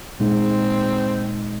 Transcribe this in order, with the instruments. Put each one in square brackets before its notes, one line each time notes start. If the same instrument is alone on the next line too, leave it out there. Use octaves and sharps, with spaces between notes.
[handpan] A#2 G#3 D#4 [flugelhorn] C4